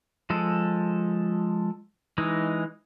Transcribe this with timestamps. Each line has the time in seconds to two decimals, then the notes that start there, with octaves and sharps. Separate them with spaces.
0.30 F3 G#3 A4
2.18 E3 G#3 D#4